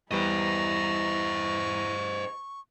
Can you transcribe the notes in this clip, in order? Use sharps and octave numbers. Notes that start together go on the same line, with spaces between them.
E2 G3 E4 B4 C5 D#5 A#5 C#6